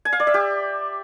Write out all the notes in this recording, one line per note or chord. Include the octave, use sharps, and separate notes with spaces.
G#5
F5
D5
E5
G4